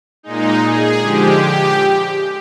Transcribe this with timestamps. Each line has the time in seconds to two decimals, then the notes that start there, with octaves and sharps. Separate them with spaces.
0.23 A#2 G#3 D#4
0.63 G#4
1.01 D3 F3 G#3 G4
1.40 G4